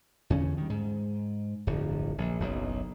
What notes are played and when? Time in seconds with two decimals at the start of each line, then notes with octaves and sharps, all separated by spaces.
0.30 E2 D3 C#4
0.57 D#3 G3
0.70 G#2
1.67 D1 G1 F2
2.18 A#1
2.40 F#1 B1 F#2